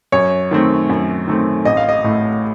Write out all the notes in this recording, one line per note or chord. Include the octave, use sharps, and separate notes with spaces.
F#2 C#5
D#3 A3 C4
F#2
D#3 A3 C4
A1 D#5
F5
D#5
A2 A3